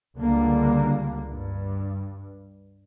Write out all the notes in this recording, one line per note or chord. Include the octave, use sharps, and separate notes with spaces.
C#2 D3 G3 A#3
G2